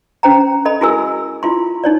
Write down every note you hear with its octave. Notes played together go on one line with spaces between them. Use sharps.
C#4 C5 G5 A#5
A4 D#5 B5
E4 F#4 G#4 A#4 G#5 E6
E4 F4 C6
D#4 C#5 D5